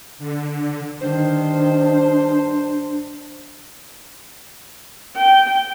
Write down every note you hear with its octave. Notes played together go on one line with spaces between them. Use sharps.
D3
G2 D#3 D4 C5
G5